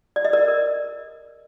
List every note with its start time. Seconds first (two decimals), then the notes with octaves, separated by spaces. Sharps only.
0.16 D5
0.25 D#5
0.33 A#4 D5
0.48 A#4